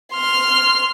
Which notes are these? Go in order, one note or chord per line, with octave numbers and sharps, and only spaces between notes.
C6 F6